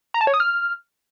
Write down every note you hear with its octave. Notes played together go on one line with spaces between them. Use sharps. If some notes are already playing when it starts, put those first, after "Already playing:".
A#5
A5
C#5
D#6
F6